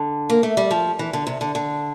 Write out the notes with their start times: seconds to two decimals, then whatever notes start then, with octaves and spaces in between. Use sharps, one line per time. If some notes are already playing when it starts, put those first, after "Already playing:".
Already playing: D3
0.30 A#3
0.43 A3
0.57 G3
0.71 F3
0.99 E3
1.13 D3
1.27 C3
1.41 D3
1.55 D3